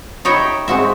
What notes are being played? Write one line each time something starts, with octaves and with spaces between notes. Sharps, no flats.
D#4 E4 C#5 E5 G5
G#3 C4 F#4 E5